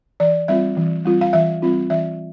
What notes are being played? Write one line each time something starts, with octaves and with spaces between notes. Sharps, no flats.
E3 D5
G3 C4 F4 E5
E3
G3 C4 F4
F5
E3 E5
G3 C4 F4
E3 E5